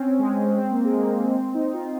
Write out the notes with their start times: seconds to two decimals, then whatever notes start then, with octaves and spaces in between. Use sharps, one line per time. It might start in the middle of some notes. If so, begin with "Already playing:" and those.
Already playing: C4 C#4
0.19 G#3
0.58 C4
0.71 A#3
0.85 G#3
0.98 A#3
1.35 C4
1.54 D#4
1.74 F4